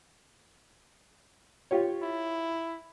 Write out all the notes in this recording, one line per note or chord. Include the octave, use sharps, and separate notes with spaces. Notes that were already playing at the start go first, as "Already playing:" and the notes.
F4 G4 C#5
E4